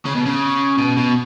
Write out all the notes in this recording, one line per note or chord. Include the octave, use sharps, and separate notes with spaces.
C#3
B2
C#3
B2
B2